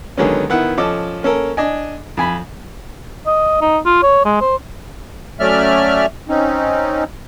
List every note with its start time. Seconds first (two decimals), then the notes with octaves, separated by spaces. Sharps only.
0.17 D3 D#3 F#3 G#3 B3 C#4
0.50 D#3 B3 E4 F#5
0.78 F3 C#4 A4 D#5 D6
1.23 A#3 C#4 A4 A#4
1.57 D4 D#5 G#5
2.17 F2 G#5 B5
3.26 D#5
3.61 D#4
3.85 F4
4.02 C#5
4.25 G#3
4.41 C5
5.40 F#3 A3 C#4 D5 E5 F6
6.28 C4 C#4 D#4